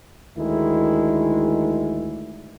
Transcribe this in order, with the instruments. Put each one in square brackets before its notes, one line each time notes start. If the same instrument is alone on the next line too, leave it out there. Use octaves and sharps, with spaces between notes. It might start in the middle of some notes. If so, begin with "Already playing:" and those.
[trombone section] D2 D#3 G#3 E4